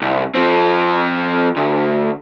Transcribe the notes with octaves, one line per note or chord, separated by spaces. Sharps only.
C2
F3 C4
D2